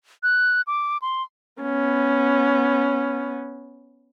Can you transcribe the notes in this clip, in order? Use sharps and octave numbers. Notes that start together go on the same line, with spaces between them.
F#6
D6
C6
B3 C#4